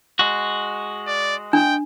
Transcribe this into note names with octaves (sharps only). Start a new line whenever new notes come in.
G#3 F#4
D5
D4 G5